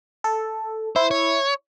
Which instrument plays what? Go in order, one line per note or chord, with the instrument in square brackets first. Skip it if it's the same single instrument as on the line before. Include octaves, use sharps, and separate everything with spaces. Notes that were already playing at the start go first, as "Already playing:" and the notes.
[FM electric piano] A4
[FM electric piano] E4 [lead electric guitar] C5
[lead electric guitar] C#5